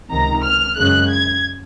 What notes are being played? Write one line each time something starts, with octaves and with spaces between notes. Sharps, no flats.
C#2 C3 D#3 A#5
F6
F#2 C#3 G#3 F#6
G#6